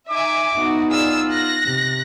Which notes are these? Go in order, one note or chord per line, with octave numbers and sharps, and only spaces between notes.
D#4 E5 G#5 D6
B3 D#4 F#4
F4 G#4 D5 E6
F#6 A#6
C3